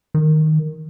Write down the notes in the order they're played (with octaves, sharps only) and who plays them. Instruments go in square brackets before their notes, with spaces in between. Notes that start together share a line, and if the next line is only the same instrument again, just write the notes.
[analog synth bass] D#3